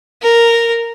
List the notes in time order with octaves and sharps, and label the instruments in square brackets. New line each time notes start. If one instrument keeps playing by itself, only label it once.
[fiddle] A#4